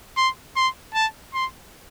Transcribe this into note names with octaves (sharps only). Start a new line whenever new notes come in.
C6
C6
A5
C6